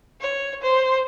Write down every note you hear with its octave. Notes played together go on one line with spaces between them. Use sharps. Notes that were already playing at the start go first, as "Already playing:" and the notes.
C#5
C5